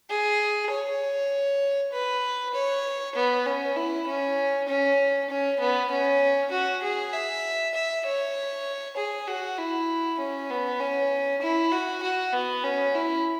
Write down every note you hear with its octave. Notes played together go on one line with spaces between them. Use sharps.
G#4
C#5
B4
C#5
B3
C#4
E4
C#4
C#4
C#4
B3
C#4
F#4
G#4
E5
E5
C#5
G#4
F#4
E4
C#4
B3
C#4
E4
F#4
F#4
B3
C#4
E4